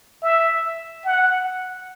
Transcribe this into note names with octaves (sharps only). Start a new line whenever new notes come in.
E5
F#5